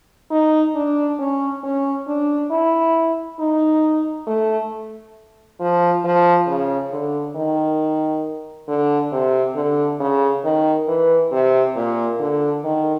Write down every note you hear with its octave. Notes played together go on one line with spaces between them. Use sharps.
D#4
D4
C#4
C#4
D4
E4
D#4
A3
F3
F3
C#3
D3
D#3
D3
C3
D3
C#3
D#3
E3
C3
A#2
D3
D#3